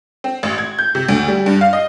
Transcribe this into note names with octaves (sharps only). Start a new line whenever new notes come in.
C4
A1
G#6
G6
C3
D2
G3
G2
F5
D#5